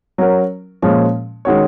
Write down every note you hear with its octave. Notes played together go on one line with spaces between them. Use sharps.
F#3 C#4 F#4 A#4
A#2 F3 G#3 C#4
D#3 G#3 C#4 F#4 C#5